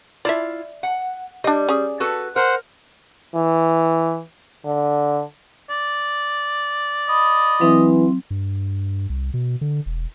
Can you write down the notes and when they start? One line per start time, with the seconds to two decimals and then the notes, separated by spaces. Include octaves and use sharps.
0.25 E4 F4 D5 E5
0.83 F#5
1.44 G3 D4 D#5
1.69 C#4 G#4
2.00 F#4 A4 B4
2.36 A#4 C5 F#5
3.35 E3
4.65 D3
5.70 D5
7.09 D#5 B5 D#6
7.61 E3 F#3 C4
8.30 G2
9.10 C2
9.34 B2
9.61 D3
9.86 E1